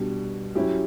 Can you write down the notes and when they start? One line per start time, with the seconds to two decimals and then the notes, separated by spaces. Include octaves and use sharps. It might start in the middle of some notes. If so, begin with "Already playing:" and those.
Already playing: B2 G3 D4
0.55 F#3 C#4 E4 G4